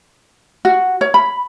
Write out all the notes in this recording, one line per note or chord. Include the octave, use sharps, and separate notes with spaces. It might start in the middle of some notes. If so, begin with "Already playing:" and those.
F#4
C#5
B5